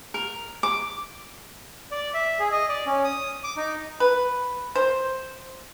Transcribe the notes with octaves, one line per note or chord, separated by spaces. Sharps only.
A#4
D6
D5
E5
G#4
D#5
D5
C#4
D#6
D6
D#4
B4
C5